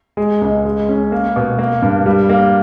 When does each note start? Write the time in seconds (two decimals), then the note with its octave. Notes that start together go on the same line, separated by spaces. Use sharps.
0.17 G#3
0.41 C#2
0.65 G#3
0.89 C#4
1.12 A#3
1.36 B2
1.59 A#3
1.82 G2
2.06 G3
2.29 A#3